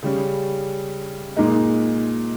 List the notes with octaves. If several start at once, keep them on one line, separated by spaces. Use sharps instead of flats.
C#3 G3 C#4
A#2 G#3 D#4